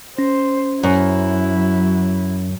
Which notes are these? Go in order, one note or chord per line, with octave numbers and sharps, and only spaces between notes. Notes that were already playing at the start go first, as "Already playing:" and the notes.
C#4 C5
F#2 F#3 E4